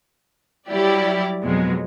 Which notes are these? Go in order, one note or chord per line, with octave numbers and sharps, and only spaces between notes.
F#3 G3 E4 G4 D5
F2 B2 F#3 G#3